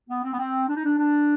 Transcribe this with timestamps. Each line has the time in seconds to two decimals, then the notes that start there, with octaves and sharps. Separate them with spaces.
0.09 B3
0.24 C4
0.33 B3
0.38 C4
0.68 D4
0.76 D#4
0.85 D4
0.98 D4